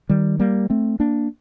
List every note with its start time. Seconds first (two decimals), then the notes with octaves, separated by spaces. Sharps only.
0.09 D#3 G3
0.39 G3 A#3
0.70 A3 C4
1.00 A#3 D4